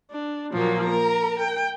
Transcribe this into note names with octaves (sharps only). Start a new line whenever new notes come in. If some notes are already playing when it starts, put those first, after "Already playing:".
D4
A#2 F3 F#3 A#3
A#4 A#5
G5